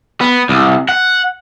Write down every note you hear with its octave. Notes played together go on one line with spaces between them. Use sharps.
B3
C2
F#5